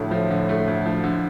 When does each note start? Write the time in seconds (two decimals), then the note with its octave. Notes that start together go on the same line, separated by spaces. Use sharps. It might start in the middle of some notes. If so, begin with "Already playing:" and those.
Already playing: D2 A2 D3 F3 A3
0.11 F3
0.30 D3
0.49 A3
0.67 D2
0.86 F3
1.04 D3